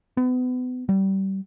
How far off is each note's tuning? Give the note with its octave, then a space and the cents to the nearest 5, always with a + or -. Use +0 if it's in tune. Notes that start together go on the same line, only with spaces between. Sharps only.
B3 +35
G3 -25